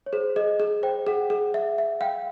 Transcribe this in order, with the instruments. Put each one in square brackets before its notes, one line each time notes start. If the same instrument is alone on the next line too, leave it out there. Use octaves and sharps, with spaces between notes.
[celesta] C#5
[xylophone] G#4 [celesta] C5
[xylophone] G#4 [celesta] D#5
[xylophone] G#4
[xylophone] C5 [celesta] G5
[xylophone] G#4 [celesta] F#5
[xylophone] G#4
E5
E5
[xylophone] F5 [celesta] G5